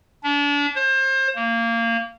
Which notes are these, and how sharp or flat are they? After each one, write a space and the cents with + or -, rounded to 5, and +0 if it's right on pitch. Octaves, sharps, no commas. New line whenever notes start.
D4 -35
C5 +30
A#3 -20